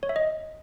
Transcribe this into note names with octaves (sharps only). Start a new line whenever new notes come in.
C#5
E5
D#5